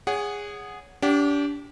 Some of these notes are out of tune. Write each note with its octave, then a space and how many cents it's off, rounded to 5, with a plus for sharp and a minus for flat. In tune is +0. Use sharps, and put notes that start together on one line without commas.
G#4 -15 C#5 +25 F#5 +0
D4 -35 G4 -5 F#5 +0